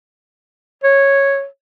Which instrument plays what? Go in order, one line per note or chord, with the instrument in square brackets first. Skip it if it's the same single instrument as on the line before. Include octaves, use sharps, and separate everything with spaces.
[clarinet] C#5